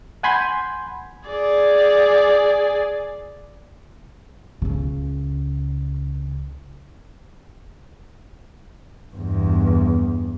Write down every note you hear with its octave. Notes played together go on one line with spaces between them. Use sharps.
F#5 G#5 B5 C6 G6 G#6
G#4 D5
C#2 C#3
E2 G2